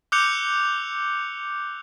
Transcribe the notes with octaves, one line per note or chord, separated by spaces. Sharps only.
D6 E6 F#6 G6 C#7 F7